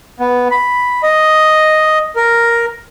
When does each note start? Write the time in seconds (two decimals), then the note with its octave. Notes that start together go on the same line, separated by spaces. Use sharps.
0.20 B3
0.51 B5
1.03 D#5
2.16 A#4